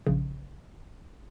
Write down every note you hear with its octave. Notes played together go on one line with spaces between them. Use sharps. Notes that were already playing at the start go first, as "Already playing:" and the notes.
A#1 C#3